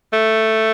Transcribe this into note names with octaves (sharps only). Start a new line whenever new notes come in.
A3